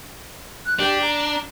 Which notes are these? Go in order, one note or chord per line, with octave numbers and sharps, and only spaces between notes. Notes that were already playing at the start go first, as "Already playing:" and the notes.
F#6
D4 G4
A#5